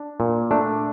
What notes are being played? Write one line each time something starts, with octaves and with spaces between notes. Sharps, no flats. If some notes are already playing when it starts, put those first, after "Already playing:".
Already playing: D4
A#2
A3 D4